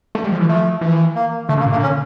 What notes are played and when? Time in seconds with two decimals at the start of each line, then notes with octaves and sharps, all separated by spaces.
0.15 A3
0.24 G3
0.32 F3
0.40 E3
0.48 F3 A3
0.81 E3
1.15 A#3
1.49 D3 A3
1.57 C#3 A#3
1.66 A#2
1.71 A#3
1.74 D3
1.82 C#4